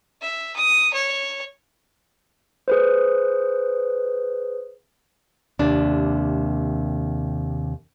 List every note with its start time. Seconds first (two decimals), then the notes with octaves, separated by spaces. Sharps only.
0.22 E5
0.56 D#6
0.94 C#5
2.68 G#4 B4 C5
5.59 D#2 C3 D4